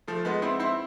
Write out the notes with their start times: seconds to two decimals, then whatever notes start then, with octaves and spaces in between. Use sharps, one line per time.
0.08 F3 A3
0.25 G#3 B3
0.42 C4 E4
0.60 C4 E4